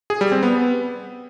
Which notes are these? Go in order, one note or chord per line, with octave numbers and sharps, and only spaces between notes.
G#4
G3
C4
B3